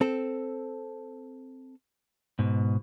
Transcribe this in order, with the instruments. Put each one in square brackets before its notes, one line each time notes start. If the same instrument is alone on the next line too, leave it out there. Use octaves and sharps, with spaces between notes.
[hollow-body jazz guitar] C4 A4
[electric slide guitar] G#2 B2